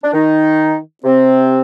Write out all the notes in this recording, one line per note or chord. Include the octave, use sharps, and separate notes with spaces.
D4
D#3 D#4
C3 C4